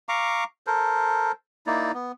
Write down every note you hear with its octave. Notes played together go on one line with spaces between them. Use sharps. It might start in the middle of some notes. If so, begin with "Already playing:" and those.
F5 A#5 C#6 D6
A4 A#4 C5
A#3 D#4 E4 D5
B3